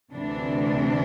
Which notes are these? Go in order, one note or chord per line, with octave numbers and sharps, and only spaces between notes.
D2 C3 E3 D4